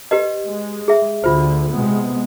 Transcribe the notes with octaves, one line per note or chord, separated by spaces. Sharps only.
G4 B4 D#5
G#3
G#4 E5
D2 D3 F4 C5
C3 G#3 B3